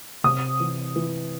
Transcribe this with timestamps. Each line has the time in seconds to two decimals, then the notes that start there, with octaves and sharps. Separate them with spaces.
0.24 C3 D#6
0.60 E3
0.96 E3